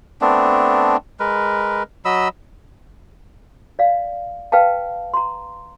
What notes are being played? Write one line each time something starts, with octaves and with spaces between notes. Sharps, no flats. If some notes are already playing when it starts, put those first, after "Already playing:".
A3 B3 C4 D4
G#3 A#4 B4
F#3 D#5 B5 E6
D5 F5
B4 F5 G5 A5
A#5 C6